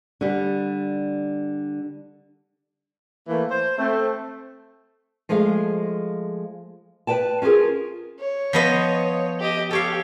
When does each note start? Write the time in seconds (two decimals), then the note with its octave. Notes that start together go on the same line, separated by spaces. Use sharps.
0.21 D3 G3
3.28 E3 A3 A#3
3.50 C5
3.78 A3 C4
5.29 F3 G#3 A3 G#4 F5
7.07 B4 D5 G5 A5
7.42 C#4 F4 G4 G#4 A#4
8.20 C#5
8.53 F3 B3 D#5
9.40 G4 D#5
9.71 G4 A4 C#5 F5